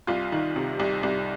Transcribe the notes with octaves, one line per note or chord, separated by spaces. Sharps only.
C2 F4
D#3
C3
C2
C2